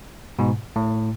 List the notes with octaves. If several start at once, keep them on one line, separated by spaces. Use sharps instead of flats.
G#2 B2
A2